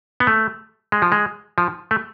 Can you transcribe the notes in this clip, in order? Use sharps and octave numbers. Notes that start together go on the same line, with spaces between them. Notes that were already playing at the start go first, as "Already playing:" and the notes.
B3
A3
G#3
F3
G#3
F3
A3